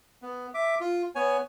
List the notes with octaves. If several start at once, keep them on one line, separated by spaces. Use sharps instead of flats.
B3
E5 D6
F4
B3 C#5 G#5